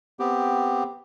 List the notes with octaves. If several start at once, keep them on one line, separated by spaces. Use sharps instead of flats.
B3 C4 G4